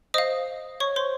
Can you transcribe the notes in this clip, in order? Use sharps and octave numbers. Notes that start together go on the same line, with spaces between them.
C5 D#5 F5 D#6
C#5 C#6
C5 C6